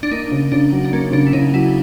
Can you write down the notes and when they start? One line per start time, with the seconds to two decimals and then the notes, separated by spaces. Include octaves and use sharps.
0.03 D4
0.11 A#3 D#4
0.31 C#3
0.52 C#3 D4
0.72 F#3
0.84 D4
0.92 A#3 C#4
1.12 C#3 D4
1.27 E4
1.33 C#3 D#4
1.53 F#3 E4